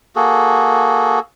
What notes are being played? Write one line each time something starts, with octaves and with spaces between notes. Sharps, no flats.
A#3 F#4 G#4 A4